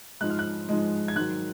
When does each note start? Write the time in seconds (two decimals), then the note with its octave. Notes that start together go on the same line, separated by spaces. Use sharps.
0.21 G#2 F3 G#3 F#6
0.30 F6
0.39 F#6
0.69 G#2 F3 G#3
1.08 G#6
1.16 G#2 D#3 F#3 F#6